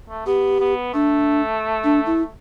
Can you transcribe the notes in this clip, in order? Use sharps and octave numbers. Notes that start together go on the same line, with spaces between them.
A3
B3 G4
B3
A3 D4
D4
E4